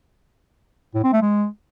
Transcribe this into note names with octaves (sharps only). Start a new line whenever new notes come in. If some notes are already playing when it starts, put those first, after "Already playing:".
A2
C4
A3
G#3